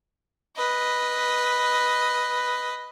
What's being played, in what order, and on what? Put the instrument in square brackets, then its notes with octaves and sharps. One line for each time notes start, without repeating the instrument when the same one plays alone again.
[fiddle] B4 D#5